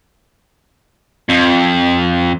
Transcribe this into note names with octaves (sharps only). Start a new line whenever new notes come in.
F2